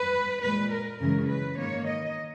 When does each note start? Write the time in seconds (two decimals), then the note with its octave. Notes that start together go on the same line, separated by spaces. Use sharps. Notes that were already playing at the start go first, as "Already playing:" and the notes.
Already playing: B4
0.43 A#2 G#3 B4
0.72 A#4
1.00 F#2 C#3 E3 G#3 A#4
1.29 B4
1.57 G#2 D#3 A#3 C#5
1.87 D#5